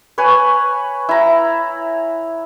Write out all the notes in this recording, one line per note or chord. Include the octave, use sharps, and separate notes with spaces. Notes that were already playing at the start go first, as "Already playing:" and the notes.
B4 C#5 G#5
E4 A#5